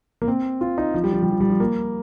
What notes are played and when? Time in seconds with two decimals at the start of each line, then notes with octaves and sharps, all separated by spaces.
0.22 A#3
0.28 C4
0.61 F4
0.78 D#4
0.94 F3
1.04 G3
1.13 F3
1.23 G3
1.31 F3
1.40 G3
1.50 F3
1.60 A#3